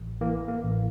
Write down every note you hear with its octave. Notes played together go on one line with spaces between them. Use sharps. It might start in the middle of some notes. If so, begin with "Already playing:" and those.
Already playing: A1
E3 A#3
A#3
A1